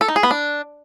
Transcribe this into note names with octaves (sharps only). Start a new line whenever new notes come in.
A4
D#4
G#4
B3
D4